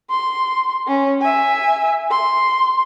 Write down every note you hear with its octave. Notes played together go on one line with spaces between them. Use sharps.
C6
C#4
E5 G#5
C6